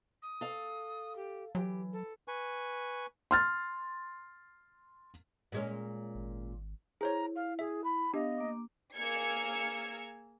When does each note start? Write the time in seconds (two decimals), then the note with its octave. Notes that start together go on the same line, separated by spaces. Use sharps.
0.22 D#6
0.41 A4 F5
1.15 G4
1.55 E3 F#3 G4
1.92 A4
2.28 B4 G#5 C#6
3.31 C6 F6 A6
5.52 A#2 G#3 C#4
6.15 G#1
7.01 E4 G#4 C5 C#5 A#5
7.35 F5
7.59 G#4 E5
7.84 B5
8.14 B3 D4 G4 D#5 F5
8.37 A#3 D6
8.94 A#3 G#4 E6 F6 G#6 C#7